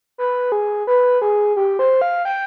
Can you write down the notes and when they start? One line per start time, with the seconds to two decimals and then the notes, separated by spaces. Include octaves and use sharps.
0.18 B4
0.52 G#4
0.87 B4
1.22 G#4
1.56 G4
1.79 C5
2.02 F5
2.25 G5